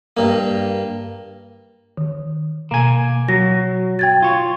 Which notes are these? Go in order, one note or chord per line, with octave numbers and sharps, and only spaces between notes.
G2 A#3
D#3
B2 A#3 G#5
F#3 A#6
G5 G#6 A6
F4 C#5